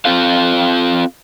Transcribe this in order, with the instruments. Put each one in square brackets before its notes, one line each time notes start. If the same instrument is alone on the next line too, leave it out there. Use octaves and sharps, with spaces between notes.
[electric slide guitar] C4 F4 A4 F5